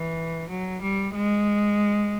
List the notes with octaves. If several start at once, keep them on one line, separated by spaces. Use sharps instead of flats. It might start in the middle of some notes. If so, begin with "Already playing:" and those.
Already playing: E3
F#3
G3
G#3